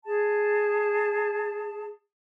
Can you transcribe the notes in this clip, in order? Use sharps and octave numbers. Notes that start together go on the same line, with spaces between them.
G#4 A5